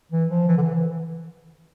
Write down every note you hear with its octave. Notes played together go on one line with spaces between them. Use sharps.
E3
F3
E3
D3
E3
E3